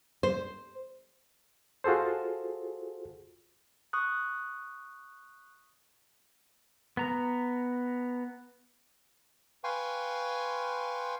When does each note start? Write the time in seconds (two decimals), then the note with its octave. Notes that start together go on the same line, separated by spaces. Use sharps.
0.23 C5
1.84 F4 F#4 G#4 A4 C5
3.93 C#6 D#6 F#6
6.97 B3 A#5
9.64 B4 F5 G5 G#5 C6 C#6